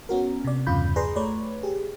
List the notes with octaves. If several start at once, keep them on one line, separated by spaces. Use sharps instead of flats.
B3 C#4 F#4 A#4
C3 D5
E2 G2 C#3 F4 B5 G6
G#4 B4 D5 A#5 C6
A3 B4 C#5 D5
G4 G#4